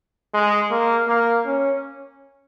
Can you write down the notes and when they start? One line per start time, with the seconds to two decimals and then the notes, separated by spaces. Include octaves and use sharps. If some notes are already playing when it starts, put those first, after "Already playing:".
0.34 G#3
0.71 A#3
1.08 A#3
1.45 C#4